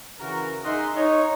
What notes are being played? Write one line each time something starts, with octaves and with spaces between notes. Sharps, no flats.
C#3 E3 F#4 A#4
D#4 G#4 D#5 E5 F#5 C6
D#4 C#5